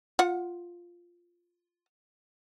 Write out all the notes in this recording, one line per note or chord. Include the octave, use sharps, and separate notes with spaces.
F4 F#5